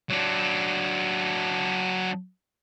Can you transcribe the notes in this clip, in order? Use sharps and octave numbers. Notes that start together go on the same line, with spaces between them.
F#3 D4